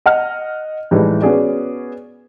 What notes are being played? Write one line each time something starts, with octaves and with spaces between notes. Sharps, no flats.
D#5 F#5 F6
A2 E3 G3 G#3 D#4
B3 C#4 F#4 G#4 D5